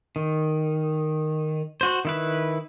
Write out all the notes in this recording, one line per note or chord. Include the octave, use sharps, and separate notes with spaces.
D#3
F#4 C5
D#3 E4 B4